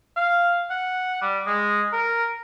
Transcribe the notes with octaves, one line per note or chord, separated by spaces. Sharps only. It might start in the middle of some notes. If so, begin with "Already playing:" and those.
F5
F#5
G3
G#3
A#4